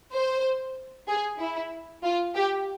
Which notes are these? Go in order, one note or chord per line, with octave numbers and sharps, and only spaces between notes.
C5
G#4
E4
F4
G4